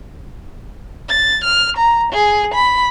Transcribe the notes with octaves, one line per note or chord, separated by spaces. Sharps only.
A6
F6
A#5
G#4
B5